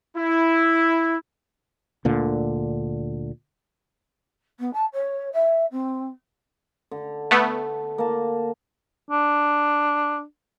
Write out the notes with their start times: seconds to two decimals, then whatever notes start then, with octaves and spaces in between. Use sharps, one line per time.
0.17 E4
2.05 D2 A#2 D3
4.59 B3
4.73 A5
4.93 C#5
5.32 E5
5.71 C4
6.91 D3
7.31 A3 B3 A5
7.98 A#3 A5
9.10 D4